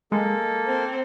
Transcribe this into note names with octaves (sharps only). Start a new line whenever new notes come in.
G#3 A#3 A4
C4